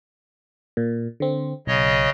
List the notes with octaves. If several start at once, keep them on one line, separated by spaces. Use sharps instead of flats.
A#2
D3 C4
B1 C#3 C#5 D#5